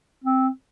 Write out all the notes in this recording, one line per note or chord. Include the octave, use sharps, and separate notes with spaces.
C4